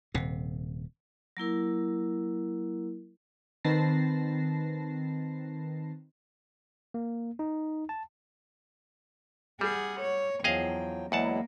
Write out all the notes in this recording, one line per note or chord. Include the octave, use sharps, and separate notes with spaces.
D#1 C3
F#3 A#3 E4 A#4
D#3 C4 B4 A5 A#6 C7
A#3
D#4
A5
G3 G#4 F#5
C#5
E2 F3 F#3 G#4 D#5 F5 G5
E2 F#3 G#3 A#3 E4 F#5 A5